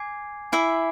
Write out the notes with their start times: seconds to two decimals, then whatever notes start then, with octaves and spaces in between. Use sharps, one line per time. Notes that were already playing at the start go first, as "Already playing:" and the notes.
Already playing: G#5 D6 G#6 C7
0.52 E4 E5 G#5 D6 G#6 C7